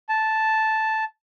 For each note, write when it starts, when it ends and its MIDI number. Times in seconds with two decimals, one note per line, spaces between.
0.09 1.04 81